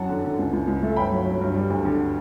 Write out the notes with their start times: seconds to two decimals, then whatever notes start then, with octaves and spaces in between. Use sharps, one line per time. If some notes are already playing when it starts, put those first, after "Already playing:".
Already playing: F#2 F#3 F#5 A5
0.09 D3
0.24 D3
0.38 C#2
0.53 C#2
0.67 C#2
0.83 A3
0.96 G1 G5 B5
1.12 F#3
1.26 F#3
1.41 G2
1.55 G3
1.70 D2
1.85 D3